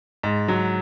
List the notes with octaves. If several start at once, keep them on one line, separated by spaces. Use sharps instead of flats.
G#2
F#3